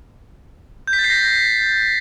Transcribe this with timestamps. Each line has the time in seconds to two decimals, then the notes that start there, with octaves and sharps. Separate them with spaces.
0.87 G6
0.93 B6
0.99 A6
1.04 C7
1.10 A#6